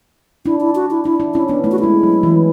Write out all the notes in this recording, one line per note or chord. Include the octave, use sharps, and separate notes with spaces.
D4 E4
E4
F#4
E4
D4 E4
E4
C#4 E4
B3 D4
A3 E4
F#4
G#3 E4
F#3
E3